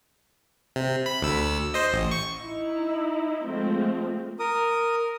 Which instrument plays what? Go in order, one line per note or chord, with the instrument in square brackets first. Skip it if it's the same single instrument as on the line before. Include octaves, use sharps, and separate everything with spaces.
[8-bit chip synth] C3
B5
D2 E6
C5 D#5
A1
C#6
[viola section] D#4 E4
F3 G#3 A3 C4
[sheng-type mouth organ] A#4 D#6